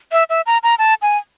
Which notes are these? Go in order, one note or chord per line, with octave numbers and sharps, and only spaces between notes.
E5
E5
A#5
A#5
A5
G#5